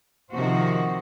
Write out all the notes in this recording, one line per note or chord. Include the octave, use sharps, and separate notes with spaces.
C3 D#3 F3 F#4 C5